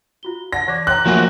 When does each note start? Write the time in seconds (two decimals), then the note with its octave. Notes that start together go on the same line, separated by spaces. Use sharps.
0.23 F4 F#4 G7
0.53 D5 F#5 A5 A#6
0.68 E3 D6 F#6 G#6
0.87 C#5 F#5 G5 A#5 C6 D6 F#6
1.06 E3 F3 A3 A#3 F#4 E5 G#5